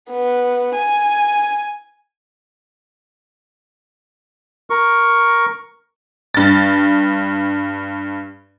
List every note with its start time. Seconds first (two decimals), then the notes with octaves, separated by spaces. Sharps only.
0.10 B3
0.75 G#5
4.70 A#4 C#6
6.34 G2 A6